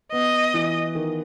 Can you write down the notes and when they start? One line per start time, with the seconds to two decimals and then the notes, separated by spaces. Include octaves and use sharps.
0.12 B3 D#5
0.54 E3
0.95 D#3